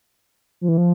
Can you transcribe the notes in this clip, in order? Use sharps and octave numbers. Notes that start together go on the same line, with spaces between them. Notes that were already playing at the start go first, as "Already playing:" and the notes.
F3
E3
F3